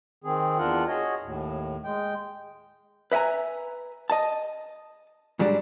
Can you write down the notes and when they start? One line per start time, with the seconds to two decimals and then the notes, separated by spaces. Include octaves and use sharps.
0.24 D#3 C4 G#4
0.58 E2 D4 F4 A#4 F#5
0.87 F#4 G#4 C#5 D#5
1.22 D#2 A2
1.84 G#3 G5
3.12 B4 E5 F#5 G#5 A#5
4.10 D#5 A5
5.39 G#2 F#3 G3 D4